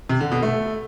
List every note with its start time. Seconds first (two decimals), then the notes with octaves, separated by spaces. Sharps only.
0.09 C3
0.20 D3
0.32 B2
0.43 A3